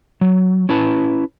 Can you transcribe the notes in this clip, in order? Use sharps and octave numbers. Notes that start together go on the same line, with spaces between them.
F#3
C#4 E4 B4 A5